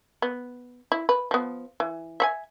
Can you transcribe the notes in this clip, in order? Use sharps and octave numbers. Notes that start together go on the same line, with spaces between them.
B3
E4
B4
F3 B3
E3
E5 F#5 G#5